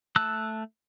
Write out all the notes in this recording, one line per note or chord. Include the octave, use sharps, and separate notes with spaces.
A3 A5 E6 F#6